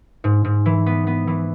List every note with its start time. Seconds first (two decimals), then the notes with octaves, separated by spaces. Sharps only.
0.24 G#2
0.45 G#2
0.66 E3
0.86 B3
1.07 B3
1.27 E3